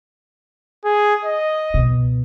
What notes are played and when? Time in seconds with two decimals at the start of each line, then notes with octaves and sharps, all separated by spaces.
0.85 G#4
1.25 D#5
1.74 C#2 B2